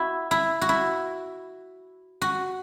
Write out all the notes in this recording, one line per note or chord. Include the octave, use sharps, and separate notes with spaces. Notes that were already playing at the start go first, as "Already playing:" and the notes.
Already playing: E4 F#4
E4
F#4
E4
F#4